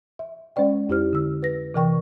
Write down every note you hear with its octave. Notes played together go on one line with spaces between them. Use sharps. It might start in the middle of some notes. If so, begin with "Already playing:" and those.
E5
G#3 C#4 C5 D5 G5
F2 E4 G4 C5 F6
D3 E6
B4 A#6
C3 E3 A#4 G5 C#6